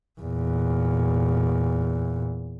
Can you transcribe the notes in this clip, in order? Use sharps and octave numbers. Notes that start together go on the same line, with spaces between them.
E2 A#2